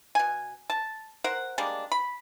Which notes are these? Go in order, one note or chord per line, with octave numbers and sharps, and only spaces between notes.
B2 G#5
A5
A#4 C5 F#5
G3 G#3 A#3 D4
B5